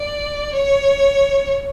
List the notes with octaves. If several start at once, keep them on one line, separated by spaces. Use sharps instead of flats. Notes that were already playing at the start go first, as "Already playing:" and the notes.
Already playing: D5
C#5